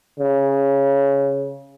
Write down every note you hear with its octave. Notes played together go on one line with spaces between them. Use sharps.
C#3